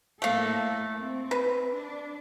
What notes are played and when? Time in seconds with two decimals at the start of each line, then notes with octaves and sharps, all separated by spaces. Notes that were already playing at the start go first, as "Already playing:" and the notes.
0.22 A2 A3 A#3 A4 F5
0.98 C4
1.31 B4
1.71 D4